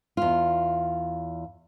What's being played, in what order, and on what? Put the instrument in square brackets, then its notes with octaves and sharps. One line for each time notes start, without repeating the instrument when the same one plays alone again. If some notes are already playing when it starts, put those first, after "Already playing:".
[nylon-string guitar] E2 F4